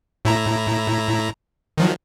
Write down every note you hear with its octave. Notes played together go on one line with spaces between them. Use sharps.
A2 E4 A#5
D#3 F3 F#3